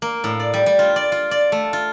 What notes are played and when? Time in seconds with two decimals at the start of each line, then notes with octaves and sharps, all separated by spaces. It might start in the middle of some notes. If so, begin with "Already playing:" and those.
0.02 A#3
0.24 A2
0.40 D5
0.54 G3
0.66 G3
0.79 F4
0.96 D5
1.12 F4
1.31 D5
1.52 A3
1.73 F4